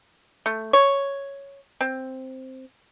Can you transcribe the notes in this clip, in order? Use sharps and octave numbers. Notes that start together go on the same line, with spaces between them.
A3
C#5
C4